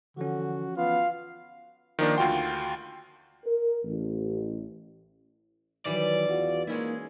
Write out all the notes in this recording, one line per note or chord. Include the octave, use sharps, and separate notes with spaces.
D3 E3 F3 C#4 F#4
B3 F4 F5
D#3 F3 A#3 D4
D2 F4 F#4 G5 C6
A#4
A1
D#3 E3 F#3 G3 D5
E2 F4 F#4
G#3 A#3 C#4 D#4 E4